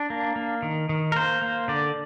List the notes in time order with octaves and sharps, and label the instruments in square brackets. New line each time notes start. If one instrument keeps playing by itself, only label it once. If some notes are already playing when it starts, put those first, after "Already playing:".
Already playing: [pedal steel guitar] D4
A#3
A#3
D#3
D#3
A#4
A#3 C5
A#3
D3 D5